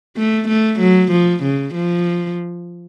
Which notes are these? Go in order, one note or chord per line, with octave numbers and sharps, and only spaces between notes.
A3
A3
F#3
F3
C#3
F3